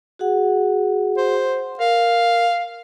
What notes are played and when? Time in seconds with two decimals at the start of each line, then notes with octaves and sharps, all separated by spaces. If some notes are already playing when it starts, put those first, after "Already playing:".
0.19 F#4 G#4 F#5
1.17 C5
1.79 A#4 F5